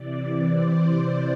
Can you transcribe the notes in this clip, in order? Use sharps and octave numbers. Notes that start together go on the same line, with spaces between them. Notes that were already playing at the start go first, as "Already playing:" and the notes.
Already playing: C3 E3 D5
D5
C5
D5